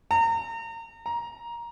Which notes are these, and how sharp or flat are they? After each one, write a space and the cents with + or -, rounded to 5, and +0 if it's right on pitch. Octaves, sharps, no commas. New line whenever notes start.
A#5 -30
A#5 +15